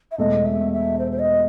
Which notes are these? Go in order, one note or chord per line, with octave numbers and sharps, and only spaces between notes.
E5
E1 E2 B2 A3 D#5
E5
E5
C5
C5
D#5